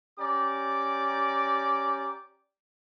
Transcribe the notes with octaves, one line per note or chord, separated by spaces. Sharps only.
C#4 G4 D5 A#5 D6